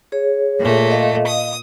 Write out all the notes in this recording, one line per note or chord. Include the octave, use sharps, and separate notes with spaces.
G#4 C#5
A#2 A3
D#5 F5
D#6